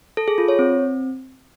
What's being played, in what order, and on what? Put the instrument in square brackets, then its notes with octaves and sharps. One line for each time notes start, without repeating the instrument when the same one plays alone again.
[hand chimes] A4
G#4
F4
C#5
C4